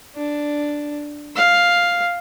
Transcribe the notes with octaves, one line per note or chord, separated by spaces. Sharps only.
D4
F5